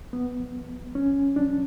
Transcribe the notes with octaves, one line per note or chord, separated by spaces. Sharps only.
B3
C#4
D4